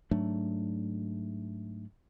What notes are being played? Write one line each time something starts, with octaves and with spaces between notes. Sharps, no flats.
G#2 F#3 A3 D4